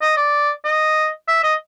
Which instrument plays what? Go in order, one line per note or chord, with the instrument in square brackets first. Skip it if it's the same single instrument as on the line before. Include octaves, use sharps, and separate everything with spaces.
[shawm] D#5
D5
D#5
E5
D#5